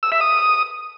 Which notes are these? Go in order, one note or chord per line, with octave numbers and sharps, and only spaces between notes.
E6
E5
D#6